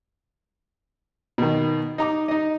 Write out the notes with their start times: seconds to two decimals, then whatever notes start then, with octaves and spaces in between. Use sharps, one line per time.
1.38 B2 D#3
1.98 D#4 A#5 D6
2.28 D#4 D#5